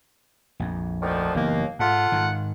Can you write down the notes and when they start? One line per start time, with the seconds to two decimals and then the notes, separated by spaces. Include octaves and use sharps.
0.60 A#1 F2
1.01 D2 D#3 F3
1.35 F#1 D#2 E3 A#3 B3
1.79 G#2 F4 A4 F#5
2.12 G#2 D#3